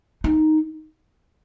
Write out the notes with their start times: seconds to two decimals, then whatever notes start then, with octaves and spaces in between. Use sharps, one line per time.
0.24 D#4